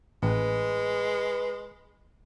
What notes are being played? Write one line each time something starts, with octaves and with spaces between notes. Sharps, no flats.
A1 G#3 B4